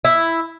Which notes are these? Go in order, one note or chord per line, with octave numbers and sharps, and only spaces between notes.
E4